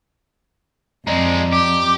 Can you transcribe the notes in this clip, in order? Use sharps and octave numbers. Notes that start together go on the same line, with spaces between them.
F2 G#3 C4 D5 D#5 A#5
G4 D6